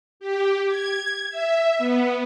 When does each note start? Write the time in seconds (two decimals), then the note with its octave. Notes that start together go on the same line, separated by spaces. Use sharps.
0.20 G4
0.68 G#6
1.30 E5
1.78 B3